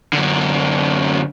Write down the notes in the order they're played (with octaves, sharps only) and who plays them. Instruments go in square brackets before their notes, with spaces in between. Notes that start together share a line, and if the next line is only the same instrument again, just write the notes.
[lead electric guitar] F#2 D3